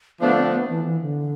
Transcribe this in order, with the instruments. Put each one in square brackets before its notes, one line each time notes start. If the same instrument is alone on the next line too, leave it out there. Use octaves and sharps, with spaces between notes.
[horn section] D3 F3 A3 D4 [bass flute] B3
[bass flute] C4
B3
E3
E3
D3